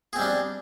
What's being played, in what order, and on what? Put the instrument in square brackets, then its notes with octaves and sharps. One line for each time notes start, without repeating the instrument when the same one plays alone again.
[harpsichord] G#4
C4
G3
D4